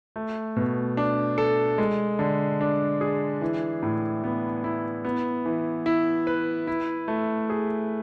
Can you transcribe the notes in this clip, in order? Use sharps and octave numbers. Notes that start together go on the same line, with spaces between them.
A3
B2
D4
A4
G#3
D3
D4
G#4
E3
A2
B3
E4
B3
E3
E4
B4
E4
A3
G#4